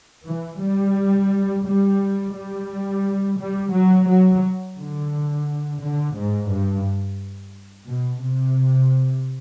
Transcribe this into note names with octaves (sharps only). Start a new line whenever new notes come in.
E3
G3
G3
G3
G3
F#3
F#3
D3
D3
G#2
G2
B2
C3